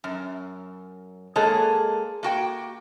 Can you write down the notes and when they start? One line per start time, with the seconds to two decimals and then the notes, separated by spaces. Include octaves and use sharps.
0.04 F#2
1.36 G#3 A#3 G#4 A4 C#5
2.23 A#3 F#4 G5